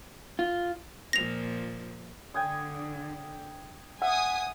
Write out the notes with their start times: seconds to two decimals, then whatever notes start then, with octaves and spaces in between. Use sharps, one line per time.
0.39 F4
1.13 A#2 F3 A#6 F7
2.34 D3 G5 G#5 D#6
4.02 E5 F#5 G#5 D#6